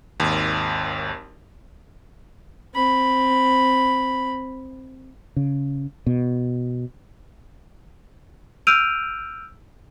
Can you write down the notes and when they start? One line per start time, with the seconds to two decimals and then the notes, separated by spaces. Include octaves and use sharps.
0.20 G#1 D#2
2.75 C4 B5
5.36 C#3
6.07 B2
8.67 E6 F6 G6 D7 D#7 F7